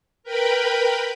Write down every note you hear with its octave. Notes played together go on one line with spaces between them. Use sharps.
A#4 B4 G5 B5